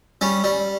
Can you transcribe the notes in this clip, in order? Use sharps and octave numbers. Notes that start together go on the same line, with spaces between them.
G3 C#4
G3